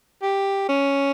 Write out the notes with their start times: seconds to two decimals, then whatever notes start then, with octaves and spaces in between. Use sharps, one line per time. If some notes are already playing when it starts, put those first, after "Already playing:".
0.22 G4
0.69 C#4